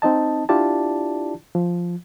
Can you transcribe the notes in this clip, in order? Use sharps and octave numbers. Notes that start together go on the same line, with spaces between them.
C4 D#4 D#5 A5
D4 E4 F4 G4 D5 A5
F3